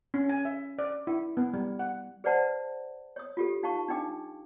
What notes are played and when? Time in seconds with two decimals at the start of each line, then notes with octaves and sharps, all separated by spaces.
0.14 C#4
0.29 G#5
0.45 E5
0.79 D5
1.07 E4
1.37 B3
1.54 G3
1.79 F#5
2.24 G#4 B4 C5 D5 F#5 A5
3.16 C#5 D#6
3.37 F4 G4 A4
3.63 D#4 F5 A5 C#6
3.88 D4 D#4 G5 D6